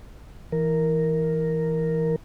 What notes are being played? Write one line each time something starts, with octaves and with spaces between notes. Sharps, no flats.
E3 A#4